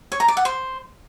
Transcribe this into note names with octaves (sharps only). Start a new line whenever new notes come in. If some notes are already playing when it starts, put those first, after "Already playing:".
C#5
A#5
D5
F#5
C5